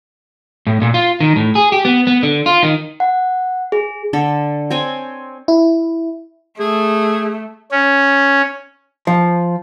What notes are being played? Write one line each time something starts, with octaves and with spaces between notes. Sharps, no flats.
A2
A#2
F4
D#3
A2
G#4
G4
B3
B3
D3
F4
D#3
F#5
G#4
D3 A4
C4 C#5 G#5
E4
A3 G#4
C#4
F3